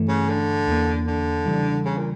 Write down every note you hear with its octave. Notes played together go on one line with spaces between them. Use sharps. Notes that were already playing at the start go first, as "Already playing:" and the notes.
Already playing: G2 E3 A3
C#3
D3
E2 E3 A#3
D3
C#3 E3 G3 D4
C#3
A#2